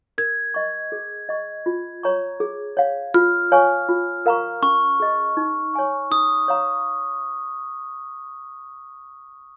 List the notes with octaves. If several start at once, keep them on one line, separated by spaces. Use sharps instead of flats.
A#4 G#6
D#5 C#6
G#4
D#5 C#6
F4
C#5 A#5 C#6
G#4
C#5 F5
F4 F6
C#5 F5 G#5 C#6
F4
A#4 F5 A#5 C#6
C#4 C#6
G#4 D#5
D#4
C#5 G#5 C#6
D#4 D#6
C#5 F5 A#5